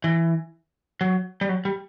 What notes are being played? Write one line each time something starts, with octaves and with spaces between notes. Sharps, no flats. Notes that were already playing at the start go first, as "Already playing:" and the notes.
E3
F#3
G3
F#3
G3